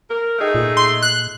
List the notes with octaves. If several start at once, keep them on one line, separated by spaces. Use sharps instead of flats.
A#4
A3 D#4 G#4
A#2
C6
F#6